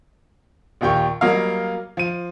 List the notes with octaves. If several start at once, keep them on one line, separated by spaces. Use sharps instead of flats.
A#1 D#2 G4 G5 C#6
F#3 G3 A#3 D#5 F5
F3 D#7